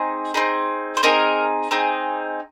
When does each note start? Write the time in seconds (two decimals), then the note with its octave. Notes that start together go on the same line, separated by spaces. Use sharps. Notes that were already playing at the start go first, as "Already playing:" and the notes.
Already playing: C4 D#4 G#4
0.34 C4 D#4 G#4
0.97 C5
1.03 C4 D#4 G#4 A#4
1.71 C4 D#4 G#4